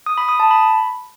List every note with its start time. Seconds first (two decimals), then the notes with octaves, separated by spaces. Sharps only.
0.06 D#6
0.18 B5
0.29 D#6
0.40 A5
0.51 B5